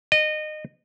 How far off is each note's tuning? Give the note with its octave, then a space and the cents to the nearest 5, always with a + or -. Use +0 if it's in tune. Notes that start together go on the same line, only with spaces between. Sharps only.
D#5 -25